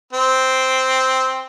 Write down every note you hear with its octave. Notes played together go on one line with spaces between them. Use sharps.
C4